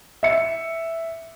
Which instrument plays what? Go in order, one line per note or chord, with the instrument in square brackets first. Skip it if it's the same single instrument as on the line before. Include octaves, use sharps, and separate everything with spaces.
[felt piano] E5 C#7